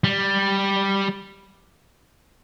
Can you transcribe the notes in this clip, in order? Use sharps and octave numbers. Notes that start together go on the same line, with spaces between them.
G3